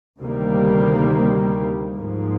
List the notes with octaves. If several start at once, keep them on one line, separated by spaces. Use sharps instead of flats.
D2 C3 D#3 G3 A#3
G#2 F3 A#3